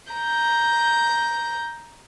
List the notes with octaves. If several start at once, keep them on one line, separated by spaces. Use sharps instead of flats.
A#5 G6